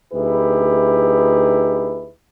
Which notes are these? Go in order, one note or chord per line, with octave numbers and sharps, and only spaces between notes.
D2 D#4 E4 G4 G#4 B4